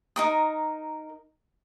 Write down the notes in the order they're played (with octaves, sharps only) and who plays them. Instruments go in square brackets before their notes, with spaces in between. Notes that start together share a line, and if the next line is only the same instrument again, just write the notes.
[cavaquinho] D#4 A#4 D#6